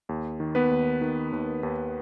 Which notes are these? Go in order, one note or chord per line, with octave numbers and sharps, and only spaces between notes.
D#2
D#3
B3 B4
D#2
D#3
D#2
D#2